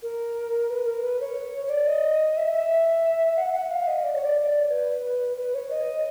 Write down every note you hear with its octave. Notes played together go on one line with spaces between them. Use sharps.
A#4
B4
A#4
B4
C#5
C#5
D5
D#5
E5
E5
F#5
F#5
F5
D#5
D5
C#5
D5
B4
B4
C#5
D#5